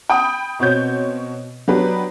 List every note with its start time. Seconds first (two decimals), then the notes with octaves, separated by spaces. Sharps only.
0.10 G5 B5 D#6
0.59 B2 C4 F#4 C#5 G6
1.68 F#3 B3 D4 G4 B4